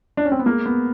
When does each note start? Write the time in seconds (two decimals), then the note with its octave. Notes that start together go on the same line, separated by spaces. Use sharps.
0.17 D4
0.25 C#4
0.32 C4
0.39 B3
0.46 G#3 A#3
0.66 B3